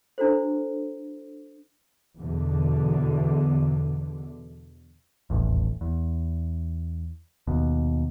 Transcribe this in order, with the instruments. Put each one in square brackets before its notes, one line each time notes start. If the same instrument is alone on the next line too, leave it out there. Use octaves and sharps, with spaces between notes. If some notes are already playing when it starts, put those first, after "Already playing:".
[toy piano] D4 E4 F#4 A4 C5
[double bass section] E2 B2 D3
[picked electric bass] D#1 A1 E2
E2
D#2 B2